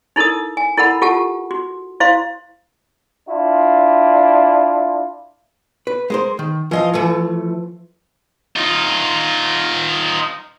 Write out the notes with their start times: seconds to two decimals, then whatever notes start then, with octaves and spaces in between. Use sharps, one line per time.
0.16 D#4 E4 A4 A#4 D#6
0.57 G#5
0.77 E4 A4 A#4 F#5 B5
1.02 F4 G4 A4 F#5 A5
1.51 F#4
2.00 E4 C5 F5 C6
3.27 D4 E4 F4
5.87 B4
6.10 G#3 A#4 C5
6.39 D#3
6.71 E3 F3 D#5 F5
6.93 E3 A3
8.56 D#4 F4